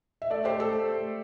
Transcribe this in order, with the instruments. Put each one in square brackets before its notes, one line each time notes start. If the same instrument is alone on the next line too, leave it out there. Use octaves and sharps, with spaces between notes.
[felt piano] E5
A3 A4 D5
G4 C5
A3
A4
A3
A3